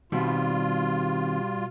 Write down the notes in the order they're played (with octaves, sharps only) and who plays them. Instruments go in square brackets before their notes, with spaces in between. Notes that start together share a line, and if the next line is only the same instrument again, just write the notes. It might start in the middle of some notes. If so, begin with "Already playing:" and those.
[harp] B2 [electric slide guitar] D#3 C4 [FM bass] G3 [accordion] F4